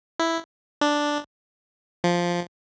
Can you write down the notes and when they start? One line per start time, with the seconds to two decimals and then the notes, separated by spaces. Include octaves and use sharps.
0.19 E4
0.81 D4
2.04 F3